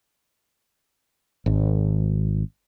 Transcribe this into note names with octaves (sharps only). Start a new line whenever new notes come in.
G#1